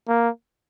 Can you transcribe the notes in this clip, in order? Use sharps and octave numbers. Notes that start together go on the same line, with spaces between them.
A#3